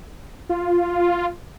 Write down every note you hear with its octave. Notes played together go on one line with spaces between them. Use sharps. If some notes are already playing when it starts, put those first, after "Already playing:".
F4